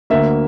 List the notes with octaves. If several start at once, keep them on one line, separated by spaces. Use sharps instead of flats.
D2 D3 A#3 E5